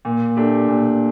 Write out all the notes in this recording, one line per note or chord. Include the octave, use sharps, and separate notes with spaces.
A#2
A3 D4 G4
A#2